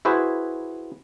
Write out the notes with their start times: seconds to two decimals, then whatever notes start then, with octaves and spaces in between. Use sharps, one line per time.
0.05 E4 F#4 G#4 B4 C5